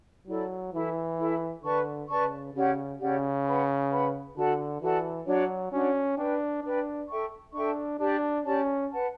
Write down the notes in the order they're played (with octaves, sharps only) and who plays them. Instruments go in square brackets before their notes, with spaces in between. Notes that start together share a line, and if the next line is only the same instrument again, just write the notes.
[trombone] F#3 [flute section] E4 A4 D5
[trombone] E3 [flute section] E4 A4 E5
[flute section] E4 A4 E5
[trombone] D3 [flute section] B4 D5 A5 C#6
[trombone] C#3 [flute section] B4 D5 A5 C#6
[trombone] C#3 [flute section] C#4 G4 D5 F#5
[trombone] C#3 [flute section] C#4 G4 D5 F#5
[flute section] B4 F#5 B5
B4 F#5 B5
[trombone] D3 [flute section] F#4 A4 D5 A5
[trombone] E3 [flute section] F#4 A4 D5 A5
[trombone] F#3 [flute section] D4 F#4 C#5
[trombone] C#4 [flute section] D4 F#4 C#5
[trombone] D4 [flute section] B4 D5 G5
[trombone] D4 [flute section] B4 D5 G5
[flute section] A4 E5 G5 C#6
[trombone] D4 [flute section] A4 E5 G5 C#6
[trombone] D4 [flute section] G4 D5 A5
[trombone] C#4 [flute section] G4 D5 A5
[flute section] B4 F#5 A5